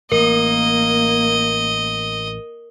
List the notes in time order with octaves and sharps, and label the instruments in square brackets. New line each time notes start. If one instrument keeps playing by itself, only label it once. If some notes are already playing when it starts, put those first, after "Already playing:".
[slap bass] A1 [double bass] A#3 [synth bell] A#4 [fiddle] D#5